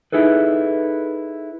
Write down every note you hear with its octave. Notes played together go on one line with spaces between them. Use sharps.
D#4 E4 G#4 A4 B4